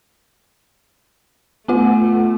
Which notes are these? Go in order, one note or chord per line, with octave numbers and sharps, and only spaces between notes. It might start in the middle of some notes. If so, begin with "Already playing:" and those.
A3 B3 F4 F#5